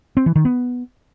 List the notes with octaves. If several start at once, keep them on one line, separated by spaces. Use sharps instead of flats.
C4
E3
D#3
B3